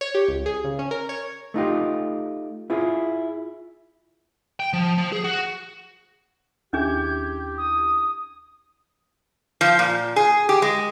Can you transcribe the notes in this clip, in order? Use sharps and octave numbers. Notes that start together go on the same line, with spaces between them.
C#5
G4
C#2
G#4
C#3
C#4
A#4
C#5
A3 D#4 F4 G4
E4 F4 G#4
G5
F3
F3
G#4
F#4
D#2 C#4 D4 E4 G4 G#4 G6 G#6
D#6
F3
A#2
G#4
G4
G#3